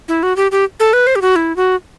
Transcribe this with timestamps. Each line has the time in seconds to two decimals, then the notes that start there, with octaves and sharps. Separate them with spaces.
0.08 E4
0.23 F#4
0.36 G4
0.52 G4
0.80 A4
0.93 B4
1.07 C5
1.16 G4
1.22 F#4
1.36 E4
1.56 F#4